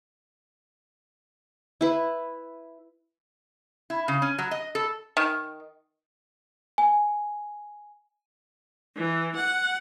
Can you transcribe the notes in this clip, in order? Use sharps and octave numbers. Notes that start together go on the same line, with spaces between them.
E4 B4 B5
E4
C#3
C#4
F#3
D#5
A4
D#3
G#5
E3
F#5